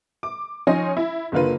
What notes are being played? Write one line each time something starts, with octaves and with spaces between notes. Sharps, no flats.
D6
F3 C#4 D#4 G#5 C6 A#6
E4
F#1 D3 A#3 F4 B4